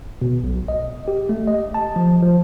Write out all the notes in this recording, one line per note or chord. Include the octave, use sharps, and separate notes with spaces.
B2
B1
D#5
G4
A3
D#5
A5
F3
F3